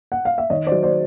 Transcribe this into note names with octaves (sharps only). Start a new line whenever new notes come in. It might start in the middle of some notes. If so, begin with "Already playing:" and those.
F#5
F5
E5
D#3 C#5 D#5
C5 D5
F#3
C5 D5